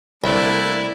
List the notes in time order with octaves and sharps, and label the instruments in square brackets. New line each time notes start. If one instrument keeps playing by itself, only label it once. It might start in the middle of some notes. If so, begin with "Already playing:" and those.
[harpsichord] C2 [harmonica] A3 A#3 D4 [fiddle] E4 D5